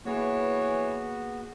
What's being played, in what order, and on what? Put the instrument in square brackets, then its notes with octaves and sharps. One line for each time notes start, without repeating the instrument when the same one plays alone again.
[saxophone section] E3 C#5 [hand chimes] A#3 G#4 [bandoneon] B3 F#4